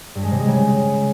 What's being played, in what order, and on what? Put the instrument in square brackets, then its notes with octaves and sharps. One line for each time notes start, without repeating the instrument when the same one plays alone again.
[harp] G2
G#3
C3
G#3
C#3